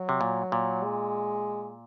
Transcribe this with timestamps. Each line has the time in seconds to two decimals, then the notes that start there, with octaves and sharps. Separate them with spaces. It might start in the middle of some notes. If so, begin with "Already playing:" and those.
Already playing: F#3
0.09 C3
0.21 A#2
0.52 A#2
0.83 G#3